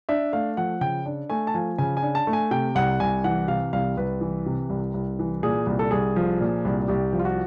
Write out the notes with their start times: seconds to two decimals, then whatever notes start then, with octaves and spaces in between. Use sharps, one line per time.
0.09 D4 E5
0.33 A3 F5
0.57 F3 F#5
0.81 C#3 G5
1.06 D4
1.30 A3 G#5
1.47 A5
1.54 F3 G#5
1.78 C#3 G#5
1.97 G#5
2.02 D4
2.15 A5
2.27 A3
2.33 G#5
2.51 C3 G5
2.75 C2 F#5
3.00 C2 G#5
3.24 E3 F#5
3.48 C3 F5
3.73 C2 F5
3.97 C2 B4
4.21 E3
4.46 C3
4.69 C2
4.94 C2
5.19 E3
5.43 A#2 G#4
5.67 C2
5.79 A4
5.91 C2 G#4
6.16 F3
6.40 A#2
6.65 C2
6.88 C2 G4
7.13 F3
7.19 F4
7.25 F#4